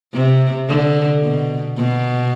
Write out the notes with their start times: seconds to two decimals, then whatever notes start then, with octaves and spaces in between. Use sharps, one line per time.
0.14 C3
0.68 D3
1.23 B2
1.78 B2